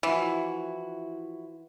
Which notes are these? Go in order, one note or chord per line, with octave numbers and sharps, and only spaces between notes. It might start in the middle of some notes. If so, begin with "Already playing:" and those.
E3 F3 E4 F#4